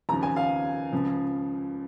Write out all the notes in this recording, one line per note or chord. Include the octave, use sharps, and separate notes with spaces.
D#2 C#3 F3 A#5
G#5
F5
C#2 C#3 F3